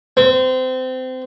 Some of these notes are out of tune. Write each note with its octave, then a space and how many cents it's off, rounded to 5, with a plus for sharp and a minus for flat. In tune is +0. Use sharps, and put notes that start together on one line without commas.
C4 -25